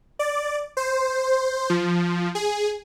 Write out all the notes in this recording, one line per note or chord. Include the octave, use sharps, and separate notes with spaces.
D5
C5
F3
G#4